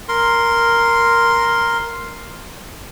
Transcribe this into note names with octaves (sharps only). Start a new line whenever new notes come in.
A#4 C6